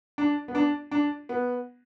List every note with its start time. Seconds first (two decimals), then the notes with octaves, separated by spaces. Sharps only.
0.18 D4
0.48 B3
0.55 D4
0.91 D4
1.29 B3